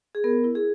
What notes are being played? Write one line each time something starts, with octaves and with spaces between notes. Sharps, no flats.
G#4
B3 A#4
E4
G#4